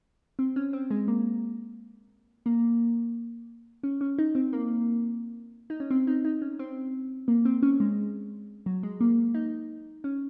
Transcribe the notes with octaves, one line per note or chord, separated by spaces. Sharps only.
C4
C#4
C4
G#3
A#3
A#3
C#4
C#4
D#4
C4
A#3
D#4
C#4
C4
D#4
D#4
C#4
C4
A#3
C4
C#4
G#3
F#3
G#3
A#3
D#4
C#4